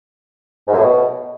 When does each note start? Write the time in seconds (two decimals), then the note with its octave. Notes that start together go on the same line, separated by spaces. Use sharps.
0.67 G#2
0.73 F#2
0.78 A2
0.83 B2